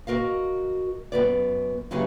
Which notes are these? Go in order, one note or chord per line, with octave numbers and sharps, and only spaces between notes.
F#4 A#4 D#5 F5
F#2 C#3 B3 D5
F#2 C#3 F#3 G3 B3 G#4